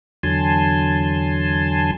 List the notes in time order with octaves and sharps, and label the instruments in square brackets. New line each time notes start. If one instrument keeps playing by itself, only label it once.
[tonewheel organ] E2 D3 F#3 G#5 A5 C6